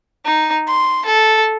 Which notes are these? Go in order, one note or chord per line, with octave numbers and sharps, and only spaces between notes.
D#4
C6
A4